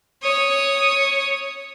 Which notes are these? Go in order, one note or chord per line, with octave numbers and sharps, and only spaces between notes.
C#5 D#6